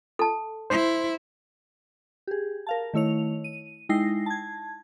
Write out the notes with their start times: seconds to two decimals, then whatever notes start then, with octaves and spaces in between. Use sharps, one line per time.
0.19 A4 A5
0.70 E4 C5 C6
2.27 G4 G#4
2.67 A#4 F5 A5
2.94 D#3 A3 E4 C#5 F7
3.44 D#7
3.89 G#3 D#4 E4 G5 A#6 C7
4.26 A5 G#6